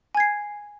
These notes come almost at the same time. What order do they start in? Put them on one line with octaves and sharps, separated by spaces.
G#5 G#6 C7